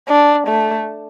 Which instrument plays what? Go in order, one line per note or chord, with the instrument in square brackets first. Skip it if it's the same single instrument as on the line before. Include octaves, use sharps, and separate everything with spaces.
[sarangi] D4
A3